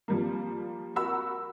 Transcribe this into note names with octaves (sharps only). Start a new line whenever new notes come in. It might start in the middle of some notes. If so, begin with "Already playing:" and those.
F3 G3 A#3
F#4 A#4 B5 E6